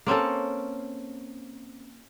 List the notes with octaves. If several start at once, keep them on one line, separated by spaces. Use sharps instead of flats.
A#3 C4 C#4 A4